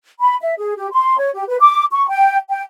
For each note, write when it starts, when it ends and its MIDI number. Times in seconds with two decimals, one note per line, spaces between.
0.19 0.36 83
0.41 0.53 76
0.58 0.73 68
0.76 0.87 67
0.92 1.17 84
1.18 1.29 73
1.34 1.44 67
1.48 1.56 71
1.60 1.83 86
1.92 2.07 85
2.09 2.36 79
2.49 2.62 79